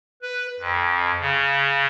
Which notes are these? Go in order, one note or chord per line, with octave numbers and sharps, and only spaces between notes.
B4
F2
C#3